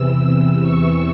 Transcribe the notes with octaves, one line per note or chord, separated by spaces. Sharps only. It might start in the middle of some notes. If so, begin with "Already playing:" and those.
Already playing: E2 C3 E3 E6
C#6